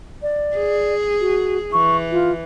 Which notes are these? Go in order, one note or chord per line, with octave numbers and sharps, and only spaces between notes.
D5
G#4
F#4
E3 C#6
F4